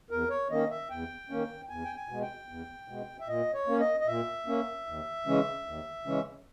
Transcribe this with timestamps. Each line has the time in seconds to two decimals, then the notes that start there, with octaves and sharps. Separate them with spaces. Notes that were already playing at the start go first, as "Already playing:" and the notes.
0.10 E2 A#4
0.30 C#5
0.50 D#3 A#3 C#4 D#5
0.70 E5
0.90 E2 G5
1.30 D#3 A#3 C#4
1.69 E2 G#5
1.85 G5
1.96 G#5
2.09 B2 G#3
2.22 G5
2.49 E2
2.88 B2 G#3
3.20 E5
3.28 A#2 D#5
3.54 C#5
3.67 A#3 C#4
3.80 D#5
4.00 D#5
4.07 A#2 E5
4.47 A#3 C#4
4.86 D#2
5.26 C#3 E3 G#3 C#4
5.66 D#2
6.05 C#3 E3 G#3 C#4